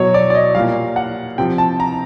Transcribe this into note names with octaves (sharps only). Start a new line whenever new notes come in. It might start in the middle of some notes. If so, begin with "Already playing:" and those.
Already playing: B2 F#3 C#5
D5
D5
D#5
A#2 G3 F5
F#5
C3 F3 G5
A5
A#5